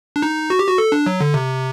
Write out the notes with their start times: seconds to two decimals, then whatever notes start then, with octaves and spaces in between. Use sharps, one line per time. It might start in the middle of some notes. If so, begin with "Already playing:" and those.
0.16 D4
0.22 D#4
0.50 F#4
0.59 G4
0.68 F#4
0.78 A4
0.92 D4
1.06 F#3
1.21 D3
1.34 C3